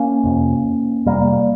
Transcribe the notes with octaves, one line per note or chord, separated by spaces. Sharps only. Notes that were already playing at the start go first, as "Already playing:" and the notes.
Already playing: A#3 C#4
F2 C3
F2 C3 G3 A#3